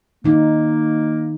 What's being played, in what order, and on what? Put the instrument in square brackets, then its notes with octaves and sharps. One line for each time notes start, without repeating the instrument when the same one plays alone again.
[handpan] D#3 D#4 [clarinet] A#3